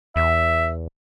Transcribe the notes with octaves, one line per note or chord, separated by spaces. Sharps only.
E2 E5